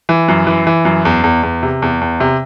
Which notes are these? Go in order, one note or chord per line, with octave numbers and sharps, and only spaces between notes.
E3
F#2
E3
E3
F#2
E2
E2
E2
C3
E2
E2
C3